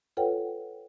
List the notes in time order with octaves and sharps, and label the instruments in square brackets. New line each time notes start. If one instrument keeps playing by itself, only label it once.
[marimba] F4 A4 B4 C#5 F#5 G5